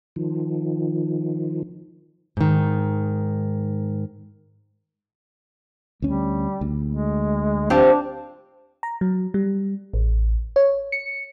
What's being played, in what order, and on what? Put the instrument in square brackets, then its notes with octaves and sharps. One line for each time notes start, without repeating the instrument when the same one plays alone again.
[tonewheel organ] D#3 F3
[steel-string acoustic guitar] G#2 D#3
[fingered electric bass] D2 C#4 [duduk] G3
[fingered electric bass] D2
[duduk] G#3
[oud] C4 F4 G4 [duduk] D4
[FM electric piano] A#5
F#3
G3
A1
C#5
C#7